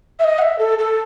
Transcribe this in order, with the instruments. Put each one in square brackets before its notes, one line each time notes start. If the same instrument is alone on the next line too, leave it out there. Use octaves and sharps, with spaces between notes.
[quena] E5
D#5
F#5
E5
A4
A4